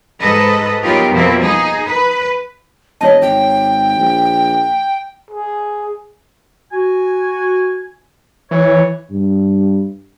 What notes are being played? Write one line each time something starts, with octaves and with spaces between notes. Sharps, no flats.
G#2 A4 B4 D#5
F#3 B3 D#4 F4 G4 A#4
F2 B2 F3 A#3 C4 E4
D#4 G#4
B4
E1 C#5 D#5 A5
G#1 G5
A#1
G#4
F#4 G#5
E3 C#5
G2